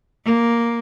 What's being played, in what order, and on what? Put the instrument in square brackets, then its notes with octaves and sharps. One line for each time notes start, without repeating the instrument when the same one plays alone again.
[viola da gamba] A#3